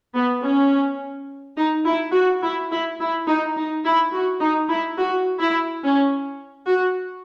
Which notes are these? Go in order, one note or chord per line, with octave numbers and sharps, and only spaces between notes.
B3
C#4
D#4
E4
F#4
E4
E4
E4
D#4
D#4
E4
F#4
D#4
E4
F#4
E4
C#4
F#4